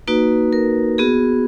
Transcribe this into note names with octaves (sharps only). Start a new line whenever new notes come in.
A#3 D#4 F#4 B4
A#4
B3 F#4 G#4